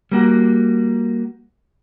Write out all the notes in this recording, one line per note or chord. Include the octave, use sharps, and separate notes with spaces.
G3 A#3 F#4